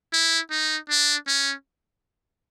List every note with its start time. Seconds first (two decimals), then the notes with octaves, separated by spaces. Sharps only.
0.13 E4
0.51 D#4
0.89 D4
1.27 C#4